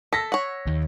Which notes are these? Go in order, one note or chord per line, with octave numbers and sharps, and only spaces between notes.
A4 E6 A#6 B6
C#5 F#5
D#2